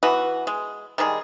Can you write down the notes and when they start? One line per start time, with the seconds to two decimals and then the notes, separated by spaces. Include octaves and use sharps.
0.03 E3 B3 F#4
0.47 G#3
0.98 D#3 G3 G#3 G#4